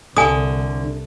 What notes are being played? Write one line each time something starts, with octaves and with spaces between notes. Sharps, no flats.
C2 D3 G#5 D#6